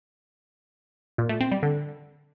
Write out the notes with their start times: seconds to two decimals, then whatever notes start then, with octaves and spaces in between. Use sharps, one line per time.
1.18 A#2
1.29 A3
1.41 C4
1.52 G3
1.63 D3